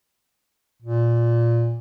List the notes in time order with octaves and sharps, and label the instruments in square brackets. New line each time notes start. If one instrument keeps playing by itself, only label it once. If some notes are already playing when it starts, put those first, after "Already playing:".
[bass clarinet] A#2